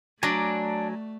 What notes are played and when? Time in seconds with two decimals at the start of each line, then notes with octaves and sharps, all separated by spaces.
0.23 F#3 A3 D4 G#5 A#5 D6